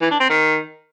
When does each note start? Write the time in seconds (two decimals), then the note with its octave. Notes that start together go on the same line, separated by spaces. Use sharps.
0.02 E3
0.11 D4
0.20 C4
0.30 D#3